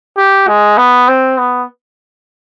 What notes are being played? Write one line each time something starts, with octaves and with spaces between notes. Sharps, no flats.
G4
G#3
B3
C4
B3